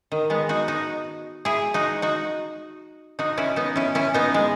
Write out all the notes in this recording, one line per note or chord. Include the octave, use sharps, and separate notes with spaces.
D#3
G#3 B3
D#4 F#4
D#4 F#4
E4 G#4
D#4 F#4
D#4 F#4
D#4 F#4
C#4 E4
B3 D#4
C#4 E4
C#4 E4
B3 D#4
G#3